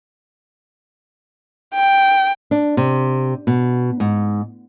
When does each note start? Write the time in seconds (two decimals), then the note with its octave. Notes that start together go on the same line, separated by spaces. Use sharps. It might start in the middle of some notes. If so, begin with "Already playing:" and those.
1.75 G5
2.51 D4
2.77 C3
3.47 B2
4.00 G#2